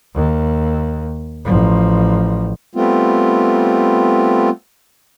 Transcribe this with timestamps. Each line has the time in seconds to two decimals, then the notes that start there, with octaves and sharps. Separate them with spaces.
0.15 D#2
1.45 A1 F3
2.75 G3 A3 B3 C4 F4